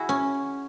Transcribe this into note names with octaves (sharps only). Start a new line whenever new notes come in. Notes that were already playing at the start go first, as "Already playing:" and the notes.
Already playing: E4 F#4 G#4
C#4